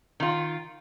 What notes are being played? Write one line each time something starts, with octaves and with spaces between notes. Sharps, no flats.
D#3 F4